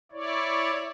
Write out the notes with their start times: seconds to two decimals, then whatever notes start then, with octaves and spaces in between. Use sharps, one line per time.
0.12 E4 C#5 D5